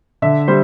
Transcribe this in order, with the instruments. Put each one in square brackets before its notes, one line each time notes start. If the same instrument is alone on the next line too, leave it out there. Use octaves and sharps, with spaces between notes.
[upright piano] D3 E5
G3 C5